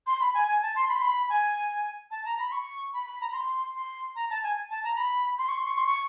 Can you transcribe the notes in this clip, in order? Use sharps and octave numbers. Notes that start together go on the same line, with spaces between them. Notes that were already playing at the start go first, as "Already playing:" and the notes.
C6
B5
G#5
G#5
A5
C6
B5
C6
B5
G#5
A5
A#5
B5
C#6
B5
B5
A#5
B5
C6
C6
A#5
A5
G#5
A5
A#5
B5
C6
C#6
C6
C#6
C6
C#6